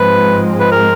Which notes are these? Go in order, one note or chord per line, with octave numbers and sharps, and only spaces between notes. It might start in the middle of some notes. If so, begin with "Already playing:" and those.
Already playing: G#2 F3 G#3 C4 B4
B4
A#4